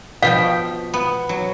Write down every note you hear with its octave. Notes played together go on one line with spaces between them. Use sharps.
B2 F3 F5 G5
B3
F#3